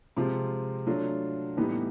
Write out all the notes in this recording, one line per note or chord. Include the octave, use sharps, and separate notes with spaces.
C3 F3 G#3 C4 F4
F#3 A3 D4 F4
A2 E3 G3 B3 D#4